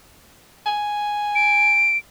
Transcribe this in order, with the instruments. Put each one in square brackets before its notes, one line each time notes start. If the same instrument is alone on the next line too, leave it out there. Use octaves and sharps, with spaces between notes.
[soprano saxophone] G#5
[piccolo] D7